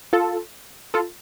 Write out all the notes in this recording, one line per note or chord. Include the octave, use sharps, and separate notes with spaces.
F4 A4
F4 A4